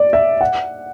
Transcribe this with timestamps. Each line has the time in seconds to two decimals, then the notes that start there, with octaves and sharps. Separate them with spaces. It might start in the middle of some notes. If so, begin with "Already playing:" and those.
Already playing: D5
0.13 E5
0.41 F#5